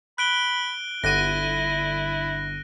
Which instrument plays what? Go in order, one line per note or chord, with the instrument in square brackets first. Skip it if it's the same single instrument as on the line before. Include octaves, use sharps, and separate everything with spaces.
[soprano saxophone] B5 [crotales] F#6 D7 G7
[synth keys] G1 D3 D#7 [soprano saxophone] E4 [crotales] F#6 A#6